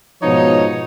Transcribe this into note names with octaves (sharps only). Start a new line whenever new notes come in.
G#2 B2 F3 B3 D#4 C#5